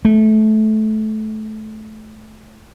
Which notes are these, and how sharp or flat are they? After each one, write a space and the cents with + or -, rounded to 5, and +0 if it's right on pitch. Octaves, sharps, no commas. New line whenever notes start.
A3 -20